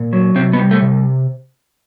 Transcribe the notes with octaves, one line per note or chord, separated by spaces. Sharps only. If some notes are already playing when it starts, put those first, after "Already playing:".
Already playing: A#2
F#3
C3 C4
B3
G3
A3
C3